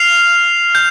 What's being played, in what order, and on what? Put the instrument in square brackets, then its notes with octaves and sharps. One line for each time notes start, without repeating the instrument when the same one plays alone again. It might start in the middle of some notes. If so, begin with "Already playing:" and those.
Already playing: [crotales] F6 C7 F7
G6